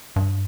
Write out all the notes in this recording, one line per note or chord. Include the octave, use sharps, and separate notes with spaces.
G2